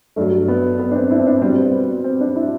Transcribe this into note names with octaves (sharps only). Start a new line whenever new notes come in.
G2 F#3 A3
B3
B3
D4
C4
E4
C4
D4
B2 G3 C4
C4
B3
C4
D4
E4